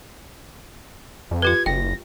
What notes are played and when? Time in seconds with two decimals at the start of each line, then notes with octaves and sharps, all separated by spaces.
1.31 F2
1.42 F4 G4 B4 G#6
1.66 F#1 G5 A#6